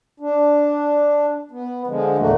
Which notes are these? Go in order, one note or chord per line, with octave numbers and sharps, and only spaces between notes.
D4
B3
D3 F3 G#3
E2 A#2 A3 A#3 F#4